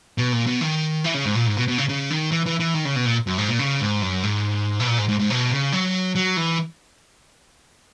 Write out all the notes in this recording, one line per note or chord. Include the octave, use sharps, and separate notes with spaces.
B2
A#2
B2
D#3
E3
C#3
G#2
A#2
G#2
B2
B2
C#3
C#3
D#3
E3
E3
E3
D#3
C#3
B2
A#2
F#2
G#2
A#2
C#3
G#2
F#2
G#2
B2
A#2
G#2
G#2
G#2
B2
C#3
F#3
F#3
E3